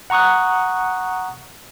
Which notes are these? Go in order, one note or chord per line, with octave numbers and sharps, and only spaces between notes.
F#5 A#5 C#6 D#6 F#6